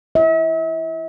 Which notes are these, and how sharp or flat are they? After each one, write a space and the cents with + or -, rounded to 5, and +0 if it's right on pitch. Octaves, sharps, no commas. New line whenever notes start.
E4 +15 E5 -40